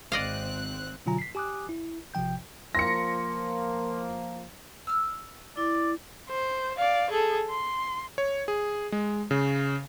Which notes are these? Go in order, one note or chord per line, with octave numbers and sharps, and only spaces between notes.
G#1 C4 D5 D#5 F5 F#6
B2 D3 F#3 F4 G#5 A#5
B6 C7
G4 G#5 D6 D#6 F#6
E4
G#1 C3 F3 G5 G6
F3 A#3 C6 A#6 C#7
E6 F6
E4 D5
C5
D5 F5
G#4 A4
C6
C#5
G#4
G#3
C#3